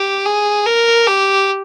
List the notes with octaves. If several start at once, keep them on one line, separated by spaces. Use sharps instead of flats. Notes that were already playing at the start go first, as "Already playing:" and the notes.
Already playing: G4
G#4
A#4
G4